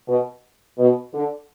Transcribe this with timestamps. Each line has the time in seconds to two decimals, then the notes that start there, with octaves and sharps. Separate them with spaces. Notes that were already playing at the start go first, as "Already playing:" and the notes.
0.08 B2
0.78 B2
1.13 D3